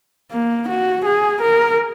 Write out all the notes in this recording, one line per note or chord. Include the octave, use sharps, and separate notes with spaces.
A#3
F#4
G#4
A#4